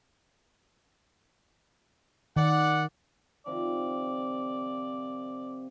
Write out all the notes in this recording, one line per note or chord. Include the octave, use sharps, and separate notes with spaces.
D#3 D5 F#5
C3 D#3 F3 D5